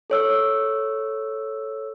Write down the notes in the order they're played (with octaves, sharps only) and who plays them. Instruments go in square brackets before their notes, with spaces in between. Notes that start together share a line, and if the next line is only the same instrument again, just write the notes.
[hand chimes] A4 C#5 E6